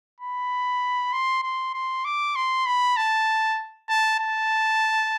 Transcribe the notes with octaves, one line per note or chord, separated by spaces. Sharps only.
B5
C6
C6
C6
D6
C6
B5
A5
A5
A5